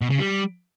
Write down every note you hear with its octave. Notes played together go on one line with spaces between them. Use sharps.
B2
C#3
G3